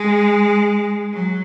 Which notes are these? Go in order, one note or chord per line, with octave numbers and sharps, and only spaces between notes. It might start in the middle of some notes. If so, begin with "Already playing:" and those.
Already playing: G#3
F#3